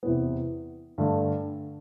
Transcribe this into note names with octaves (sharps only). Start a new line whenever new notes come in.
E2 C3 E3 B3
G2 D3 A3